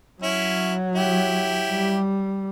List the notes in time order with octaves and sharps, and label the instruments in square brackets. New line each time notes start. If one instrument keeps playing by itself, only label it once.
[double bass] F#3 [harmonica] C#4 E4
[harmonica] E4 G4
[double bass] G3